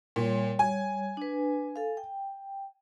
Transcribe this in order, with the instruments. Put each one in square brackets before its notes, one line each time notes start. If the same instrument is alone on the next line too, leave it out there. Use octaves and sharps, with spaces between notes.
[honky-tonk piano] A#2 [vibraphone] G3 C#5
[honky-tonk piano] G#5
[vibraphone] D4 B4
A4 F5
G5